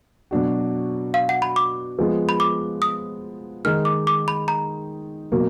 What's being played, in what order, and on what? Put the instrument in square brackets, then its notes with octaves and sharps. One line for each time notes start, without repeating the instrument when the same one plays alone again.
[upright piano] B2 F#3 D4 F#4
[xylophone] F5
F#5
B5
D6
[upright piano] F3 G#3 B3
[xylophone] B5
D6
D#6
[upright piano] D#3 G#3 D#4 [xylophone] F6
[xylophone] D6
D6
B5
A#5
[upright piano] B2 F#3 A#3